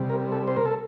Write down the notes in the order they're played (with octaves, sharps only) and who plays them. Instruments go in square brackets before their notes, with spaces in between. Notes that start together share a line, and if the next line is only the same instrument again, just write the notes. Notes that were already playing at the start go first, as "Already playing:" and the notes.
Already playing: [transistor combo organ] C3 G3
A#4
A4
C5
A#4
A4